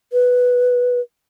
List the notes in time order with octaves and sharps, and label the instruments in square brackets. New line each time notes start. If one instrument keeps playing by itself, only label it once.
[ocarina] B4